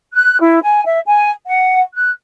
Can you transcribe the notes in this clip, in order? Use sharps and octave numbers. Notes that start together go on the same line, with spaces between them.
F#6
E4
G#5
E5
G#5
F#5
F#6